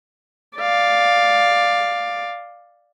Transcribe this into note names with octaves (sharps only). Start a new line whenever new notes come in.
D5 F5